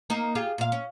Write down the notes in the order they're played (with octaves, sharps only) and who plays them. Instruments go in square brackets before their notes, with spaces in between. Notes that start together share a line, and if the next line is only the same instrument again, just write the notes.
[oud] A#3 D#4
F4 G4 G#4
A#2 F5
C#4